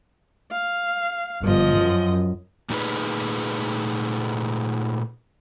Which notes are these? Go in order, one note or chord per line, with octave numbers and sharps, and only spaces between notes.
F5
G1 F3 D#5
F#2
A#2 A3 D#4 F#4 G#4 B4